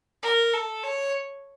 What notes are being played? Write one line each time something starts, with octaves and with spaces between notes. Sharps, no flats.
A#4
A4
C#5